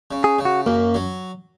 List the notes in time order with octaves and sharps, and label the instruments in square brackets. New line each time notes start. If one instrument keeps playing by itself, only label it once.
[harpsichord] C#3
[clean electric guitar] G#4
[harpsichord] C#3
[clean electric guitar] F#4
[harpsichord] F#2 [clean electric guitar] A#3
[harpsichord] F#3